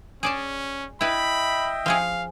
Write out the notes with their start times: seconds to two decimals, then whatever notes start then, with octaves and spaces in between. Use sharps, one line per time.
0.23 C#4 G#4 D5 A5
1.01 E4 B4 D#5 E5 G5 B5
1.86 F3 C#4 G#4 F5